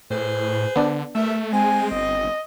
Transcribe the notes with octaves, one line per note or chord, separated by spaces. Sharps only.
A2 G#4 B4 C5
D3 B3 D4 D5
G2 A3 A#4 E5
G#3 C4 G#5
G1 D#5